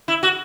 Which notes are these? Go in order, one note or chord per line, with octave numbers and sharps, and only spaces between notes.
E4
F#4